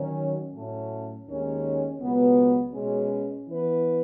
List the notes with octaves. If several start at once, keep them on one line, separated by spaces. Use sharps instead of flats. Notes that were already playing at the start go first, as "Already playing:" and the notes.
Already playing: D#3 F#3 C#4
A2 F#3 A3 C#4
D#2 D#3 G#3 C#4
C#2 B2 F#3 B3
B2 G#3 C#4
E3 B3 E4 B4